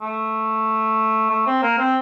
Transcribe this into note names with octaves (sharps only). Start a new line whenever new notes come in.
A3
A3
C4
A#3
C4